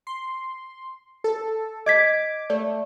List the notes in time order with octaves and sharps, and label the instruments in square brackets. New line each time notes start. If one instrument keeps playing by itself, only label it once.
[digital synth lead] C6
A4
[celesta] D#5 G#6 B6 [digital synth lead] D6
[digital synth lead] A3 [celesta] D5